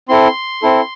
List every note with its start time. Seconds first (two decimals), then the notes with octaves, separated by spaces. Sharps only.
0.09 C4 E4 A4 C6
0.63 C4 E4 A4